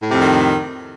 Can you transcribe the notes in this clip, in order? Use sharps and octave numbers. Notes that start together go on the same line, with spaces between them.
F2 A2 C3 D#3